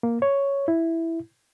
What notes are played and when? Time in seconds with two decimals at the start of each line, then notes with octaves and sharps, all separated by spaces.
0.03 A#3
0.22 C#5
0.68 E4